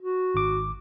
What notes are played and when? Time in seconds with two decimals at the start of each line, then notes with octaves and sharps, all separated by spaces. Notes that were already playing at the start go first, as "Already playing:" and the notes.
0.01 F#4
0.34 G#1 D6